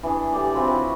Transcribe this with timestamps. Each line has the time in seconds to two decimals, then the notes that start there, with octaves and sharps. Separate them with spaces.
0.03 E3 D4 G#4
0.33 A2 G4 A4 D5
0.54 C4 F4 F#4 B4
0.67 E4 F#4 C#5 C#6